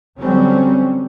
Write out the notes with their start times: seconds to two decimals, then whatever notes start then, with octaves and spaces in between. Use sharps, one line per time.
0.20 D3 F#3 G3 C4 C#4